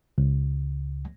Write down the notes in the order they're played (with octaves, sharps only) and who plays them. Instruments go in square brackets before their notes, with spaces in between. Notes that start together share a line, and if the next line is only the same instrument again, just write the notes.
[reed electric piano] C#2